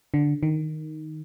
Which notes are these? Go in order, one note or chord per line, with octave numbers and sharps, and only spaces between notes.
D3
D#3